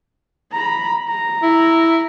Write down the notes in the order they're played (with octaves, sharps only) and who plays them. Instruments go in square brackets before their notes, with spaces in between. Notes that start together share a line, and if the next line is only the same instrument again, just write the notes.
[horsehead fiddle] A#5 B5
A#5
[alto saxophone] E4